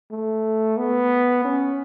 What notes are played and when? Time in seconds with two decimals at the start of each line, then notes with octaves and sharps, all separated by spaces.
0.11 A3
0.78 B3
1.44 C#4